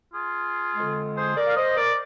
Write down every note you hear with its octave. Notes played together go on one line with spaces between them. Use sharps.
F4 G#4
F2 D3 G#3
G#4 C5
A#4 D5
F5
C5 D#5
A#4 D5